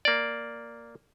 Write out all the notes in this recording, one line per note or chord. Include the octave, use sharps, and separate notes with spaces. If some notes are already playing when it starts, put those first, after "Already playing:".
A#3 D5